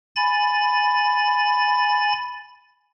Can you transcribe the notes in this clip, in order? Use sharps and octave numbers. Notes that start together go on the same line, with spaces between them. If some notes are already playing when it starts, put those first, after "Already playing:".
G#5 B5 A6